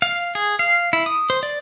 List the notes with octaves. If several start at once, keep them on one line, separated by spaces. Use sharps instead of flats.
F5
G#4
F5
E4
D#6
C5
D5